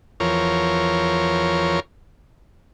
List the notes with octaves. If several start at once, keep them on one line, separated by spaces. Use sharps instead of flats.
E2 F3 A#4 C#5